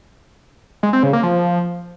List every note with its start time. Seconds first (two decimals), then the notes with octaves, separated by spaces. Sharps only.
0.83 G#3
0.93 C4
1.03 C#3
1.13 A#3
1.23 F3